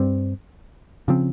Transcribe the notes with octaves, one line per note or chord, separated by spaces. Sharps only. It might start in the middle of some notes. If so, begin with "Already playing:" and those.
Already playing: G2 G3 C4
C#3 F3 C4